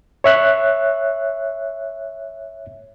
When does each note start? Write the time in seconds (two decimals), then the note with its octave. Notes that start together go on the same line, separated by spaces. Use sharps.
0.24 C#5 E5 F#6